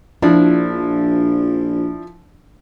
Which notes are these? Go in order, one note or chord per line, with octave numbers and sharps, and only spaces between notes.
A#1 F3 D4 E4